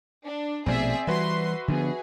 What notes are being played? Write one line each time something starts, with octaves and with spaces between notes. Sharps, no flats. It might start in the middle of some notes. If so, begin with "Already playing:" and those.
D4
A#1 B2 A3 C4 G#4 D5 E5
E3 G3 F#4 B4 E5 C6
D3 F3 B3 G#4